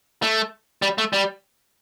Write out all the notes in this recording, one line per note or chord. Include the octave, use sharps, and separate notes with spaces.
A3
G3
A3
G3